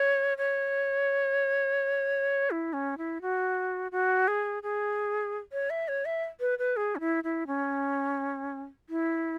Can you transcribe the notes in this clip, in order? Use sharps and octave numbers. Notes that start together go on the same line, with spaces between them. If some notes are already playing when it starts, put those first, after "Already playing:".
Already playing: C#5
C#5
E4
C#4
E4
F#4
F#4
G#4
G#4
C#5
E5
C#5
E5
B4
B4
G#4
C#4
E4
E4
C#4
E4